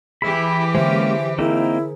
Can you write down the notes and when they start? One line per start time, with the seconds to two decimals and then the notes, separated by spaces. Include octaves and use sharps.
0.22 E3 E4 G4 G#4 B5
0.75 D3 G#3 A#3 C#4 C5 E5
1.39 A#3 C4 D#4 E4 G#4 A#4